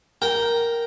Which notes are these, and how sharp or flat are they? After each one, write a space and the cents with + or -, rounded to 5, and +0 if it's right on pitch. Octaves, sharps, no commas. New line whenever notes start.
A#4 +0 G5 -10